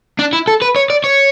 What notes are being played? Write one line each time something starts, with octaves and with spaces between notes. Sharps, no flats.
D4
E4
A4
B4
C#5
D5
C#5